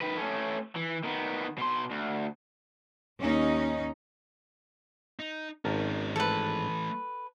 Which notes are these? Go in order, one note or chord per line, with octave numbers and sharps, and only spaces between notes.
D#3 B4
A3 C#4
E3
D#3 B3
B2 C6
D2
D#2 C#4 D#4
D#4
G#1 C#4 D#4 A#4 A5
E3 A3 A4 B4